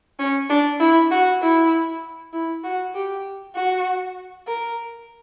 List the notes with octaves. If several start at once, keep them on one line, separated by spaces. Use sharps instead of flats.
C#4
D4
E4
F#4
E4
E4
F#4
G4
F#4
A#4